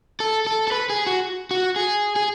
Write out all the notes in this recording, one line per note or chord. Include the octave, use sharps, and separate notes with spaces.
A4
A4
A4
B4
G#4
F#4
F#4
G#4
G#4